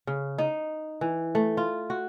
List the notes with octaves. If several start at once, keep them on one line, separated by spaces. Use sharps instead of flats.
C#3
D#4
E3
A3
F4
F#4